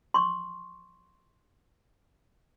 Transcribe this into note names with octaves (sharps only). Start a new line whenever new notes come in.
C6 C#6